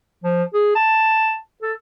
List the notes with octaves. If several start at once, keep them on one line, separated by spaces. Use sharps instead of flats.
F3
G#4
A5
A4